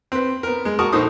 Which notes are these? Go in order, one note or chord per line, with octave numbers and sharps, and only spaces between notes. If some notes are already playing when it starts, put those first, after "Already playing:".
C4 B4
B3 A#4
G#3
F#4 A#4 A5 C#6 D#6
A#1 D#4 A4 C5 C#6 D#6